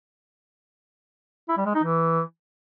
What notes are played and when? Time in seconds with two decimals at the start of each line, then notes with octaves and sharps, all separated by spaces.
1.49 E4
1.57 G3
1.66 G#3
1.75 D#4
1.83 E3